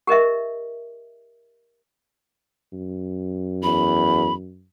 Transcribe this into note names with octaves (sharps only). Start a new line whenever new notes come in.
G4 A#4 D#5 E5
F#2
E2 B5